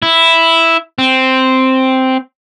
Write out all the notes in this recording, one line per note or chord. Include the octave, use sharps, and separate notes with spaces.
E4
C4